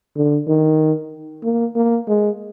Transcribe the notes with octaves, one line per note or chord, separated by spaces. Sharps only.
D3
D#3
A#3
A#3
G#3